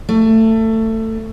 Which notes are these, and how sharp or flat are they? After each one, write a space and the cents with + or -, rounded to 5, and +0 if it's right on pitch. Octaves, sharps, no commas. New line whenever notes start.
A3 +20